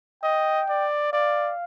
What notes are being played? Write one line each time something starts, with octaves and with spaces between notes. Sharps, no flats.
D#5 G5
D5
D5 F5